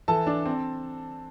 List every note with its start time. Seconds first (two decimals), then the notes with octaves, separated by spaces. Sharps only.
0.08 E3 A4 A5
0.27 D4
0.45 C4